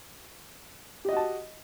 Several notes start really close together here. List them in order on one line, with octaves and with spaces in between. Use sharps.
G4 D#5 F#4 A5